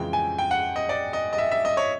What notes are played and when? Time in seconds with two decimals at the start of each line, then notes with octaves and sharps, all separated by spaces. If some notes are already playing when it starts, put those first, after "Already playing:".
Already playing: F2 C#3 E3 G#3 G5
0.13 G#5
0.38 G5
0.51 F#5
0.76 D#5
0.89 D5
1.13 D#5
1.33 D#5
1.38 E5
1.51 E5
1.65 D#5
1.77 C#5